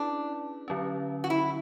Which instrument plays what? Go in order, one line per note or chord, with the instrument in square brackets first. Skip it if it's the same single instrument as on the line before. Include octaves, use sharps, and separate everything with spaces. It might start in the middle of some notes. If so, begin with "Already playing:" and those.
Already playing: [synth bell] C#4 E4 G#4 B4 [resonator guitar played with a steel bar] D4
[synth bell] D3 F#3 C#4
[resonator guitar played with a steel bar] F#4
E4